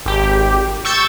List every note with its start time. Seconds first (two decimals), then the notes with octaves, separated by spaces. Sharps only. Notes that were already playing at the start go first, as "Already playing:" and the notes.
0.06 G#1 G4
0.85 C#6 E6 G6 A6